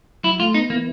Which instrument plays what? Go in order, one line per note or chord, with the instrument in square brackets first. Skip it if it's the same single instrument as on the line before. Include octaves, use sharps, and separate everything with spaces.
[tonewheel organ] F#3 [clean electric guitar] E4
[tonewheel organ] A3 [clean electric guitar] F4
[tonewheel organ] B3 [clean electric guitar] D#4
[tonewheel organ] E3 [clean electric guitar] A#3